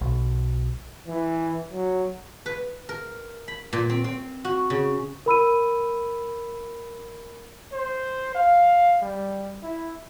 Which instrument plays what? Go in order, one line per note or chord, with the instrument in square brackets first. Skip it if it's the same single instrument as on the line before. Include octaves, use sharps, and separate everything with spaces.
[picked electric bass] B1
[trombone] E3
F#3
[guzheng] B4
A#4
B5
A#2
C4
C4
F#4
C#3
[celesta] A#4 B5 E6 D#7
[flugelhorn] C5
F5
G3
E4